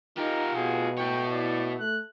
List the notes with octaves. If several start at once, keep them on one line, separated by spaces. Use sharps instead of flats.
D#4 F4 G4 A#4
B2 G#4
E4 C#5 G5
D5
A3 F#6